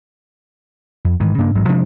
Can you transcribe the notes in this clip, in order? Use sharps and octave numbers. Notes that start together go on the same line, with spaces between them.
F2
G#2 D#3 E3
G2 C#3 A#3 D4
A1 G#2 F#3
C3 F3 G#3 D4